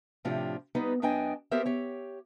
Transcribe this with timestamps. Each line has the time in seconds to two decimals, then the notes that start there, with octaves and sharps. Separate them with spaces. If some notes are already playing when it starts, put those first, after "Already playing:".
0.25 A2 C3 F3 D4 F4 G4
0.75 G3 B3 D#4 B4
1.02 F#2 B3 D4 D#5 G5 G#5
1.51 B3 G4 A#4 C5 E5
1.66 G4 C#5